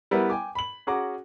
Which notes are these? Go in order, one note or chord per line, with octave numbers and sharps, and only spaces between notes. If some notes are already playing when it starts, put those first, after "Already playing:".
G3 B3 E4 A#4 B4
G5 G#5 D6
B5 F#7
C#4 F#4 G#4 F#5 A#5 D6